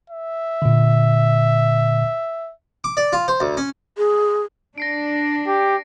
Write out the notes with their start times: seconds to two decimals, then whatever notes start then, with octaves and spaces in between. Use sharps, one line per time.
0.10 E5
0.62 A#2 D3
2.84 D6
2.97 D5
3.13 F4
3.28 C5
3.40 D2
3.57 C#4
3.98 G#4
4.78 D4 A#6 C7 D7
5.47 G4